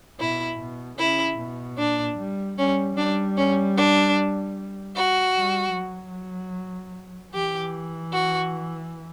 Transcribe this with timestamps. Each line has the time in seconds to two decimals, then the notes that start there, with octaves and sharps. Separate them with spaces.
0.20 B2 E4
0.59 B2
0.99 C#3 E4
1.39 B2
1.78 A#2 D4
2.18 G3
2.58 G3 C#4
2.97 G3 D4
3.37 C#4
3.77 D4
4.96 F#4
5.35 G3
5.75 F#3
7.34 E3 G4
8.13 F#4